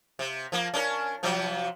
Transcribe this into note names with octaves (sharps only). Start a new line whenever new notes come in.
C3
F3 A#3
C#4 D4 A#4
C3 F3 F#3